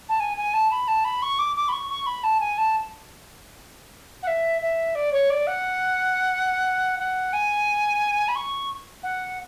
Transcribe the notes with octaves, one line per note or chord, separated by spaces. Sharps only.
A5
G#5
G#5
A5
B5
A5
B5
C#6
D6
D6
B5
C#6
C#6
B5
A5
G#5
A5
F#5
E5
E5
D5
C#5
D5
F#5
F#5
G#5
B5
C#6
F#5